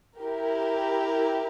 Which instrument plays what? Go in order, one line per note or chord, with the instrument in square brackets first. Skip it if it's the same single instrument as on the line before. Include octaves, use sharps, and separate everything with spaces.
[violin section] E4 G4 A#4